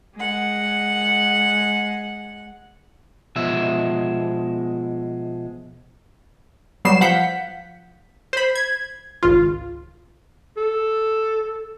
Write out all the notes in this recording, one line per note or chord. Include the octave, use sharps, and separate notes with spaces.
G#3 F#5
B2 F3 G#3 E5
F#3 G3 B3 C7 E7
F3 F5 F#5 G6 B6
C5 B5
G#6
G#1 C#2 F4
A4